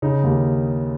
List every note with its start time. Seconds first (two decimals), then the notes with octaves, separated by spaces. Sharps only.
0.02 C#3 D#4
0.24 D#2